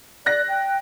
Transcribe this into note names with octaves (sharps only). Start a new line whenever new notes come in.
D5 F#6 A#6
G5